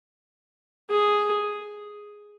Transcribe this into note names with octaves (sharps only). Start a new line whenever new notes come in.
G#4